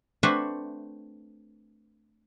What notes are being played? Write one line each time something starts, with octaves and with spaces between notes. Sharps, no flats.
A3 C4 D4 F#4 B4 E5